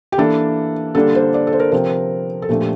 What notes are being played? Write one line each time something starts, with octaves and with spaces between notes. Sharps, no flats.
G4
E3 A#3 D4 A4
D3 G3 A#3 D4 A4
C5
D5
A4
C5
A#4
C3 F3 C4 A#4
A4
A#2 F3 A3 D4 G4
G4